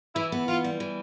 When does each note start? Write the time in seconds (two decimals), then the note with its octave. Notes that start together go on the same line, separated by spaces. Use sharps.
0.15 E3 E4
0.32 B3
0.48 E3 F4
0.64 G3
0.80 E3